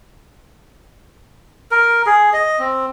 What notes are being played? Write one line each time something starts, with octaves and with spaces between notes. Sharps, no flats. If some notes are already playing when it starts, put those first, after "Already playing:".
A#4
G#4
D#5
C4